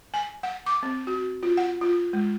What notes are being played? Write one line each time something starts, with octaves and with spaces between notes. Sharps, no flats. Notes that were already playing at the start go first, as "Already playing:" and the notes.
G#5
F#5
D6
C4
F#4
F4
F#5
F4
G#3